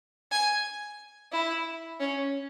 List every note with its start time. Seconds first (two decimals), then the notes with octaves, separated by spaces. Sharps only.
0.32 G#5
1.33 E4
2.00 C#4